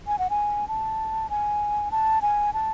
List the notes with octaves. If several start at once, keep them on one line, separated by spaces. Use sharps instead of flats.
G#5
F#5
G#5
A5
G#5
A5
G#5
A5